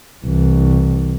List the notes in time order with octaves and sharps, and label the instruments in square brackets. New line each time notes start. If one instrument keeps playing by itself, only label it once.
[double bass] C2 E3